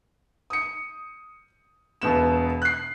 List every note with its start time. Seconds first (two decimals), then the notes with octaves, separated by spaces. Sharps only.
0.50 D#6 C#7
2.02 E1 B2 B3 E7
2.62 F#6 C7